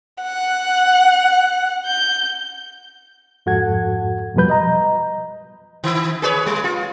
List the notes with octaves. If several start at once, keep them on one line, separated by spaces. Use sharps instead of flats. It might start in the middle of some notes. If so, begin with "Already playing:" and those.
F#5
G6
F2 G#2 F#4 A4 F#5 G#6
F2 B2 F3 G3 B4 G6
D#5 A#5
D#3
G#4 B4 C#5
G3
F4